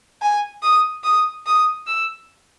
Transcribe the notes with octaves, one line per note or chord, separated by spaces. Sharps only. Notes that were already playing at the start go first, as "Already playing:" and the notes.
G#5
D#6
D#6
D#6
E6